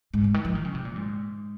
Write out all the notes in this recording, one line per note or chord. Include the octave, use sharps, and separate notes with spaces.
G#2
C3
D#3
F3
D#3
C#3
C3
A#2
G#2